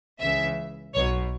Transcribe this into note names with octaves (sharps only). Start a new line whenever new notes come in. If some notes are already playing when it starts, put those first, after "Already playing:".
C#2 C#3 E3 E5
B1 B2 C#5